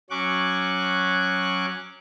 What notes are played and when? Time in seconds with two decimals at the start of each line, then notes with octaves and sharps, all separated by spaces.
0.10 F#3 C#4 C#6 D6 F#6